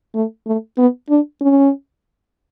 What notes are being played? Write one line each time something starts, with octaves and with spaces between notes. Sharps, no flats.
A3
A3
B3
D4
C#4